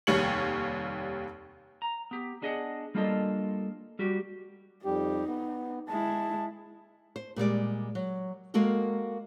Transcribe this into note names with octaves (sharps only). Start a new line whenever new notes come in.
F1 D#2 G3 C#5 C#7 F#7
A#5
B3 G4
B3 D4 G#4 D#5 E5 F#5
G3 A#3 D4 F4 A4 D#5
G3 F#4 G4
F2 G3 D#4 G4
B3
G#3 E4 A5
C5
A#2 G3 G#3 D5
F#3
G#3 A#3 F#4 A4 A#4